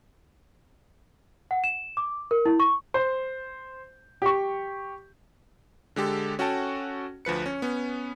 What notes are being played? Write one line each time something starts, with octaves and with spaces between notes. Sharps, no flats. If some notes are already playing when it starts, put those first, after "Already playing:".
F#5
E7
D6
A#4
E4
C#6
C5
G4 C#6
D3 G#3 G4 A4
C#4 F#4 A4 F#5 G5 A5
D2 F3 B4 C#7
C#4
B3 C#4